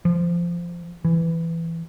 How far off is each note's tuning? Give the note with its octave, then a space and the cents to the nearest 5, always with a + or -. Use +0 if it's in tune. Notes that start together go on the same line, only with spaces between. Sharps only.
F3 -20
E3 +10